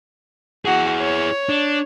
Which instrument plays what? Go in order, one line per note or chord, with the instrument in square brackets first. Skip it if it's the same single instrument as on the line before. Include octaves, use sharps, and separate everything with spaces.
[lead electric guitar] E4 G#4 [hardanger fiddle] F#4
[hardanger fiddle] C#5
[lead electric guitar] D4